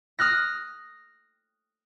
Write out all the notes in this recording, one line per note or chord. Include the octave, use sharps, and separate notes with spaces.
D#6 F6 F#6 A#6